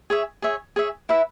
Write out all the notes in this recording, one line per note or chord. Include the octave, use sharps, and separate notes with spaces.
G#4 C#5 E5
G#4 C#5 E5
G#4 C#5 E5
E4 B4 E5